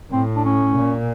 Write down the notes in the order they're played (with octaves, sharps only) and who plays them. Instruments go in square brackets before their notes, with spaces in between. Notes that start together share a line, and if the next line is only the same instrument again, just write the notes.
[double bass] A2 [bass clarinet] C4
[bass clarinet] D4
C#4
[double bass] A#2